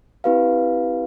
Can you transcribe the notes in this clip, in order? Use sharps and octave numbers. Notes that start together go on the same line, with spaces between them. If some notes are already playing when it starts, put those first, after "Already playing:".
C4 E4 G4 B4 F5